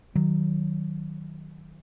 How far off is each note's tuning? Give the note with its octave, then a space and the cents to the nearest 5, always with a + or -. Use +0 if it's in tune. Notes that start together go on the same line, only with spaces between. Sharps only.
D#3 -5 F#3 +0